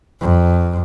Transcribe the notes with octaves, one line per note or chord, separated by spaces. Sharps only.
F2